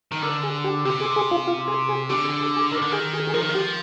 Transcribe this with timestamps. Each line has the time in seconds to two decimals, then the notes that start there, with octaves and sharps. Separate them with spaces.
0.12 D#3
0.22 D3 A#4
0.43 G#4
0.64 G4
0.85 C3 G4
1.01 G#4
1.16 G#4
1.31 F4
1.47 F4
1.68 G#4
1.89 G#4
2.10 D3 G4
2.25 G#4
2.41 G#4
2.56 G#4
2.72 D#3 A#4
2.82 D3
2.92 D#3 G#4
3.13 G#4
3.27 G#4
3.34 F3 A#4
3.41 D#3
3.49 F3
3.55 G4